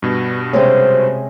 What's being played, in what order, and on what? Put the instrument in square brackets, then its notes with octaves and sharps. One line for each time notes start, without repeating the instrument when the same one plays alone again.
[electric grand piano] G2 B2 [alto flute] B3
[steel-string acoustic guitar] C3 G#3 C#4 [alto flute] C5